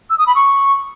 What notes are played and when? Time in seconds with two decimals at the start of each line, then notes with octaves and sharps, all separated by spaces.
0.10 E6
0.18 D#6
0.27 B5
0.35 C#6